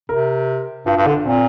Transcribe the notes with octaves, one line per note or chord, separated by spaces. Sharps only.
C3 A#4
G2 F4
G2
F4
D3 D4
A#2 C4